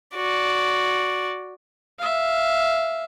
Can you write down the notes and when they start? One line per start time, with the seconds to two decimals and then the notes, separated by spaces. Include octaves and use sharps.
0.16 F#4 D5
1.99 E5 F5